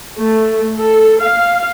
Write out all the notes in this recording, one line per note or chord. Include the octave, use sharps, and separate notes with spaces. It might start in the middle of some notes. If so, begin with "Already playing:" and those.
A3
A4
F5